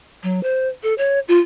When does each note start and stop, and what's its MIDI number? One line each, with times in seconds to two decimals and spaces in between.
0.23 0.42 54
0.43 0.68 72
0.83 0.94 69
0.98 1.19 73
1.28 1.39 65